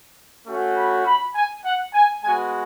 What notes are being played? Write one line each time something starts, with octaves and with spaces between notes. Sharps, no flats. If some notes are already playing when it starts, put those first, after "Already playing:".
A3 C#4 F#4
B5
B5
G#5
F#5
G#5
G#3 B3 F#4 G#5